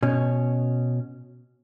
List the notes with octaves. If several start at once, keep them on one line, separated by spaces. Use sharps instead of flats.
B2 C#4